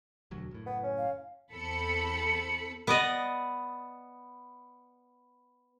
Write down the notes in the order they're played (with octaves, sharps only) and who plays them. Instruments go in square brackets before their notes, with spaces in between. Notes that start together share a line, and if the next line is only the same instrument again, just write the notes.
[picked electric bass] E1 D2 F#3
F#1 A2
[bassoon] B3
C#4
[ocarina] F5
[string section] E2 C4 A4 B5 C#7
[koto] B3 D5 D#5